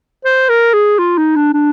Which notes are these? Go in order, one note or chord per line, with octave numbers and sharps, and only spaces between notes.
C5
A#4
G#4
F4
D#4
D4
D4